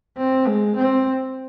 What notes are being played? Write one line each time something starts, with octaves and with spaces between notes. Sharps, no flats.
C4
G#3
C4